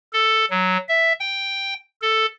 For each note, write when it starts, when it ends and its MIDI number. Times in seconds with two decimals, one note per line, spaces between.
0.13 0.45 69
0.51 0.77 54
0.89 1.13 76
1.20 1.74 79
2.02 2.26 69